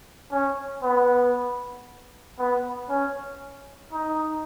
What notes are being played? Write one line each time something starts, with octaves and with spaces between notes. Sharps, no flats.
C#4
B3
B3
C#4
D#4